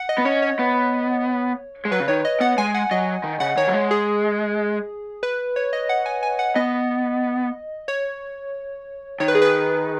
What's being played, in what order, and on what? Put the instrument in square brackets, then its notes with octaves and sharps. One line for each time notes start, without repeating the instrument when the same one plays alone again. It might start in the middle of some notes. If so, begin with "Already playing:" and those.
Already playing: [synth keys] F#5
D#5
[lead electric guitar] B3
[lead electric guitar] C#4 [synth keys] C#5
[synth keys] C#5
[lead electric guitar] B3
G#3
[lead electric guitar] F#3 [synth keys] B4
[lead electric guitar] C#3
[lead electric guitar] D#3 [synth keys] C#5
[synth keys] D#5
[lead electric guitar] B3 [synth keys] F#5
[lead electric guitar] G#3 [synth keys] G#5
[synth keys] F#5
[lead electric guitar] F#3 [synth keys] D#5
[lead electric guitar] D#3
[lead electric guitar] C#3 [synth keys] F#5
[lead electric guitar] D#3 [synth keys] C#5
[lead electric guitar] F#3
G#3
[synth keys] G#4
B4
C#5
D#5
F#5
G#5
G#5
F#5
[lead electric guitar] B3 [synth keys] D#5
[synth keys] C#5
[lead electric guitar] D#3 [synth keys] C#5
[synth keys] B4
G#4
B4